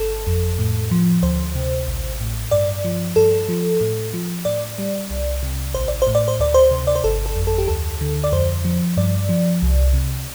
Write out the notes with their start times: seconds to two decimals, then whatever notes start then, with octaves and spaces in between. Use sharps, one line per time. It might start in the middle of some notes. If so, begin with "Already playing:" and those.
Already playing: G1 A4
0.27 F2
0.59 A2
0.91 F3
1.23 D2 C5
1.55 C3
1.88 A1
2.20 A2
2.51 G2 D5
2.84 F3
3.16 G2 A4
3.49 F3
3.81 A2
4.13 F3
4.45 A2 D5
4.78 G3
5.10 C2
5.43 C3
5.74 A1 C5
5.88 D5
6.02 C5
6.07 A2
6.15 D5
6.28 C5
6.39 D2 D5
6.54 C5
6.71 C3
6.87 D5
6.95 C5
7.04 G1 A4
7.26 A4
7.36 F2
7.47 A4
7.58 G4
7.68 D2 A4
8.01 D3
8.24 D5
8.32 F2 C5
8.65 F3
8.97 G2 D5
9.29 F3
9.62 C2
9.93 C3